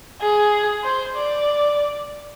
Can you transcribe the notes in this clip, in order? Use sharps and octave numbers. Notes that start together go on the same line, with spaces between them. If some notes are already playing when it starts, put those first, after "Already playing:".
G#4
C5
D5